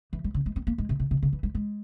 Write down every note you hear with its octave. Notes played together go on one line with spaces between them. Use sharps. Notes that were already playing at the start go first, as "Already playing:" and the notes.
E3
G3
C#3
G#3
C4
A#3
G#3
C3
C3
C3
C#3
E3
G3
G#3